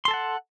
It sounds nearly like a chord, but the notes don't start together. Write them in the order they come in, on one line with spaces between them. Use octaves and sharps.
C6 A4 A5 F#5